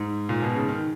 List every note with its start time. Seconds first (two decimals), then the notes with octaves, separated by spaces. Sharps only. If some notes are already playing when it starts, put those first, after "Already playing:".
Already playing: G#2
0.29 A#2
0.43 B2
0.56 C#3
0.69 D#3